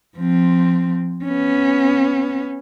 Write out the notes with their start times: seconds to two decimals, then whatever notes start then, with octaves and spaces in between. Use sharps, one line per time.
0.17 F3 C4
1.24 B3 C#4